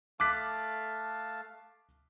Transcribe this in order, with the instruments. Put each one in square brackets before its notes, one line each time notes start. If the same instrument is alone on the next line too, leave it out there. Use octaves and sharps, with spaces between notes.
[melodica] A3 F5 A5 [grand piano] D6 F#6 B6